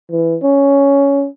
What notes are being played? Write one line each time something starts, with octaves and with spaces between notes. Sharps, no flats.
E3
C#4